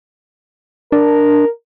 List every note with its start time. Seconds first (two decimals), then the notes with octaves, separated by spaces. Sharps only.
0.92 D4 A#4